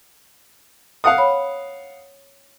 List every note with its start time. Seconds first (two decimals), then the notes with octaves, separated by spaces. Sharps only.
1.04 F5 F#5 D#6
1.18 C#5 B5